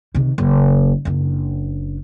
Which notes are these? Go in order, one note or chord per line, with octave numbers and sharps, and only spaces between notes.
C3 D#3
F#1
F#1 D4